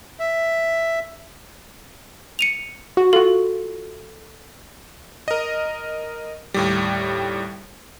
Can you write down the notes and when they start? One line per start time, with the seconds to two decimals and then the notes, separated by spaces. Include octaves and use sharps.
0.20 E5
2.39 C#7 D#7 F7
2.97 F#4
3.13 F4 F#4 A4
5.28 A#4 D#5
6.54 D#2 A2 G3